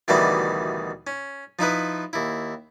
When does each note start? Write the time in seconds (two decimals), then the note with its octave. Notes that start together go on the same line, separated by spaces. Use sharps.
0.08 D2 B2 D#3 E3 G3 D5
1.07 C#4
1.59 F3 D#4 E4 B4
2.13 D#2 E4